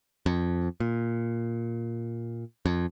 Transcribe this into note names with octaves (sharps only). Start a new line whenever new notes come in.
F2
A#2
F2